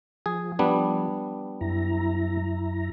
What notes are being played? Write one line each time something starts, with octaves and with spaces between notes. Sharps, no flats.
F3 G#4
G3 B3 D4
F#2 E4 A#5